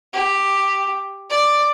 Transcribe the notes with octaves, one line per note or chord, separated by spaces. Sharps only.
G4
D5